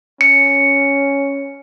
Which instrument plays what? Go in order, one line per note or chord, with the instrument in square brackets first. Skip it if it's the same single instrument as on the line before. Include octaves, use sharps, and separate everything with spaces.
[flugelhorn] C#4 [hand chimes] C#7